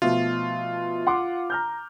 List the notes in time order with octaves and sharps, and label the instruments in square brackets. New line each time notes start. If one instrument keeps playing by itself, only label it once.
[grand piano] B2 F3 A3 [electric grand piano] F4
[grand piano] F#5 C6 D6
A#5 F6 G6